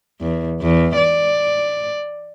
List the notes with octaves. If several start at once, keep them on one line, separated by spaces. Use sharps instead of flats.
E2
E2
D5